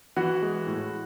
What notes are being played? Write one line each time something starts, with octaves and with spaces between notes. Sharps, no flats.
E3 F#4
G#3
A2